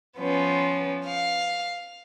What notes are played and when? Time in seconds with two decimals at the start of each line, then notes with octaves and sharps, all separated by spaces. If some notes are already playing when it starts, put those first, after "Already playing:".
0.18 F3 B3 C#4
1.05 F5